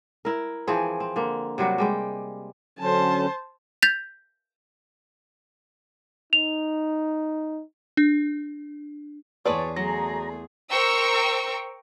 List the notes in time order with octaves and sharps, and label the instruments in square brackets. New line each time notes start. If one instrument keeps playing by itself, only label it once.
[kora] E4 A#4
E3 F3 C4 G#4
C4
D3 A#3
C3 F#3 G3 F#4
G3 G#3 G5
[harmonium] D3 F#3 C#4 [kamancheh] C5 A5
[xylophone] G6 A6 B6 F7
[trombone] D#4 [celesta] F7
[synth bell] D4
[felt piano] E2 A5 C6 [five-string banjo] G#4 B4 D5 [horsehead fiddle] C#5
[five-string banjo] F#3 [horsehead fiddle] A3 G#4 [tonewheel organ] A#5
[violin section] A#4 C5 G5 A#5 C#6 E6